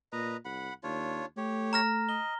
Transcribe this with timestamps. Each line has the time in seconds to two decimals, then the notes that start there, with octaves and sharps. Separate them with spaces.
0.12 A#2 B4 D#5 A#5
0.45 C2 F#5 B5
0.83 D#2 D4 F4 C#5
1.37 A3 G4 C#5
1.73 A#5 F6 A#6
2.09 D#5 G7